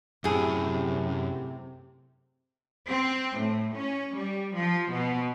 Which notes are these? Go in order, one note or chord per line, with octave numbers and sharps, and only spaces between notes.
F#2 A2 C3 G#4
C4
A2
C#4
G3
F3
B2